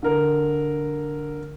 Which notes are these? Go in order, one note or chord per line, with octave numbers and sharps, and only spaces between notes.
D3 A#4